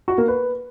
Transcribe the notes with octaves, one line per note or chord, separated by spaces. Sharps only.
F#4
A#3
B4